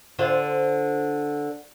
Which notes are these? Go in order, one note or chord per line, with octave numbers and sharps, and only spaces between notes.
D3 F4 C5